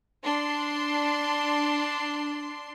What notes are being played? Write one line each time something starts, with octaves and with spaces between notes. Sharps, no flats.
D4 C6